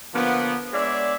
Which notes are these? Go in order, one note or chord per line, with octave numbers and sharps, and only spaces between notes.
D3 F3 A#3 B3
G#3 B3 D4 C#5 D5 E5